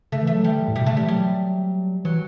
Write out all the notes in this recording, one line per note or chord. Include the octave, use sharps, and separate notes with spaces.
C#3 A3
E3 A3
F#3
E3 G3
D3
A2
B2 G3
C#3 A3
D3
G3
E3
F#3 G3
E3 F#3